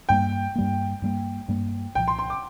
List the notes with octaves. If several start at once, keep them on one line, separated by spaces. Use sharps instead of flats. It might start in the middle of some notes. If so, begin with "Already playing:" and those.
G2 G3 A#3 G5
G2 G3 A#3
G2 G3 A#3
G2 G3 A#3
C2 A#2 F3 G5
C6
C6
D6